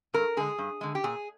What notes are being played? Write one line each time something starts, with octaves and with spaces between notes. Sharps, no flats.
G2 A#4
D3 G#3 G#4
G2
D3 G#3
G4
A#2 G#4